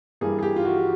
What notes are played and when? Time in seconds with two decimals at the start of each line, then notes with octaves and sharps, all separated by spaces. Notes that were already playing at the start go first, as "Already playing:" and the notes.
0.21 G2 E3 G3 A#3 G#4
0.39 G#4
0.43 G4
0.56 F4
0.65 F#4